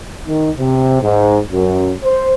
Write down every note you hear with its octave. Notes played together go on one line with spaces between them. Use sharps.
D#3
C3
G#2
F#2
C5